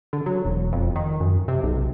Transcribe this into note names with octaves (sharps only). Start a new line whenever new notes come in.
D3
F#3
E1
F2
D#3
F#2
C3
B1